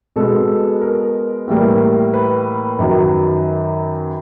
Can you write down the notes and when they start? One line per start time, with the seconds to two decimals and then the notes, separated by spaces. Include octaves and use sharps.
0.16 B2 G#3 B3 A4
0.81 A#4
1.48 A2 E3 G3 A#3
2.14 B4
2.79 F#2 D#3 F#3